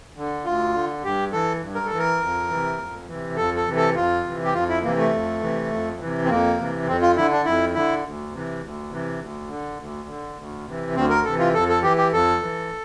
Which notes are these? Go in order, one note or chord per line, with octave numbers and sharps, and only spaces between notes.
D3
D2 F4
D3
G2 G4
E3 A4
G2
A#4
A4
E3
A#4
F2
C3 E3
F2
C3 E3
F2 A4
A4
C3 E3
A4
F2 F4
C3 E3
G4
F2 F4
E4
C3 E3 A#3
A3
F2
C3 E3
F2
C3 E3
C4
F2 A#3
C3 E3
F2 C4
F4
D3 E4
D4
F2 E4
D3 E4
D2
C3 E3
D2
C3 E3
D2
D3
D2
D3
D2
C3 E3
D2 C4
A#4
C3 E3 A4
F4
F2 A4
A4
E3 G4
G4
F2 A4
E3